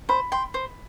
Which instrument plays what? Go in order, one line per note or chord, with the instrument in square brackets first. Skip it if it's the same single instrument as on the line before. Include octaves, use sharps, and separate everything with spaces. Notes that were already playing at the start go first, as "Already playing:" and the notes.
[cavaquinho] C5 [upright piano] B5
[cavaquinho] G5 C6
C5